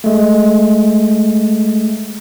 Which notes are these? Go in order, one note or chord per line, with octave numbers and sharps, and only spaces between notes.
G#3 A3